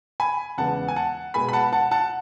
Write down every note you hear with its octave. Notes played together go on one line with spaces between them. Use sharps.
G#5 B5
E2 C#3 G#3 B3 F#5 A5
G#5
F#5 A5
B2 G#3 B3 G#5 B5
B5
F#5 A5
F#5 A5
F#5 A5